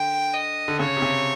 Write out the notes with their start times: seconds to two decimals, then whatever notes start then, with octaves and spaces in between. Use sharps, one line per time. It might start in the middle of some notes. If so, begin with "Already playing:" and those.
Already playing: D3 G5
0.34 D#5
0.68 D3
0.79 C#3 C#5
0.97 C3
1.02 C#3